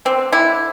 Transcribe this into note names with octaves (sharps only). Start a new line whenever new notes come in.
D3 C4
D3 E4